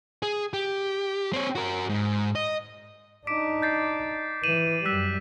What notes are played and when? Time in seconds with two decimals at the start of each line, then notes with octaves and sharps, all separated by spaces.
0.23 G#4
0.53 G4
1.33 C4 C#5
1.55 F#4 A#4
1.89 G#2
2.35 D#5
3.27 D4 D#4 D6 B6 D7
3.62 G6 A6 C7
4.43 E3 D#7 E7 F#7
4.85 F#2 G3 E6 F#6 B6